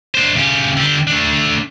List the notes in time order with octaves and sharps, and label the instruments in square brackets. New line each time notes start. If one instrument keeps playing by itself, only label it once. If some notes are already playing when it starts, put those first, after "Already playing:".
[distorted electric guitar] D4 C5
C#3 G4
D3 G4
A3 D4